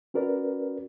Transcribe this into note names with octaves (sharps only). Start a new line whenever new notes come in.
C#4 F#4 A#4 B4 D5